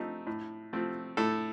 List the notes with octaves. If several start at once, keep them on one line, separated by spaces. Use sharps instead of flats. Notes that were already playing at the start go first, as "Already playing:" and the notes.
Already playing: F3 A3 C4 D#4
A2
F3 A3 C4
A2 A4